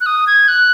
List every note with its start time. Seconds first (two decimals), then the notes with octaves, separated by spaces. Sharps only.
0.01 F#6
0.06 D#6
0.27 G#6
0.48 F#6